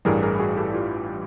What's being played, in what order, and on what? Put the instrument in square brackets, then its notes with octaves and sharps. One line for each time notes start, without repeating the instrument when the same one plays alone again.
[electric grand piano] A1 G2 E3 G3 G#4 A#4
G#4 A#4
F#4 G#4
G4 A4
F4 G4